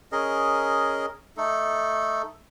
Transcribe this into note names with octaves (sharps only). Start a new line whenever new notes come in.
C#4 G#4 A#4 D#5
A3 D#4 A4